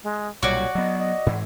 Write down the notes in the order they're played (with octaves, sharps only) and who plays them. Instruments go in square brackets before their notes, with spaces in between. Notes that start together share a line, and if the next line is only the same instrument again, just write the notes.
[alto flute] G#3
[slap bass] B1 A#2 G3 [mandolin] F#4 D5 [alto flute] C#5
[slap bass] F#3 B3 [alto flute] D#5
[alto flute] D#5
[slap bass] G#2 E3